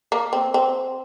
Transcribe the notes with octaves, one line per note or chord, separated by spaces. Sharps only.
A#3
C4
C4